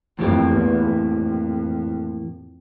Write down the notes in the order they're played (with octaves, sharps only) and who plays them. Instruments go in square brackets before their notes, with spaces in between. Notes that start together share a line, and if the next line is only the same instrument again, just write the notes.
[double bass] F2 [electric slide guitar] A2 E3 A#3 E4 G4
[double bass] E2
F2